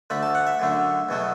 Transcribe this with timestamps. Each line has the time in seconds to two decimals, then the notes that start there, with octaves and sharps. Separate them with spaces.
0.10 D2 D3 A3 B5
0.23 A5
0.35 F#5
0.47 E5
0.60 F#2 D3 A3
1.09 E2 B2 F#3 A3